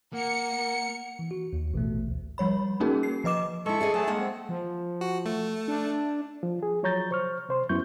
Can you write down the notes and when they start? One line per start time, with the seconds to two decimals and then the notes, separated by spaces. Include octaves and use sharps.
0.13 A#3 A#4 F#5 C#7
1.19 E3
1.31 F#4
1.53 D#2
1.74 A1 B2 A3
2.09 D2
2.38 F3 G3 C#5 B5
2.80 A#3 C#4 D#4 F#4 G#4 A#4
3.03 C7
3.24 F3 B4 D#5 D6 E7
3.66 G#3 E4 A4 C#6
3.81 G#4 D5 D#5
3.94 F#3 A3 G#4 A5
4.07 G#3 A#3 F#5
4.19 C4
4.49 F3
5.01 F#4
5.26 A3
5.68 D4
6.43 F3
6.63 G#4
6.83 F3 F#3 C#5 A#5 G6 A6
7.11 C5 C#6 F6
7.49 C3 C5 C6
7.69 F#2 B3 E4 C#6 G6